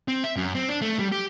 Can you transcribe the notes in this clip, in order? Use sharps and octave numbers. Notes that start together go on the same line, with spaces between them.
C4
E5
F#2
C4
D4
A3
G3
G4